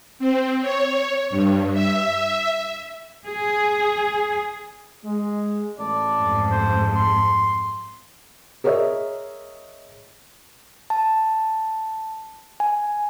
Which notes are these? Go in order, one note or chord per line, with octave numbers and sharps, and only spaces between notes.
C4
C#5
G2
E5
G#4
G#3
A1 A3 D5 A5
F2 G#2
C5
C6
G#4 A#4 C#5 D#5 E5
A5
G#5